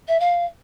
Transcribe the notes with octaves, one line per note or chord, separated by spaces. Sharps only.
E5
F5